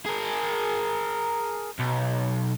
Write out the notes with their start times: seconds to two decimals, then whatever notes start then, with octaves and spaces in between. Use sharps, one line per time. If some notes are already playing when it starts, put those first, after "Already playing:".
0.06 G#4 A#4
1.80 B1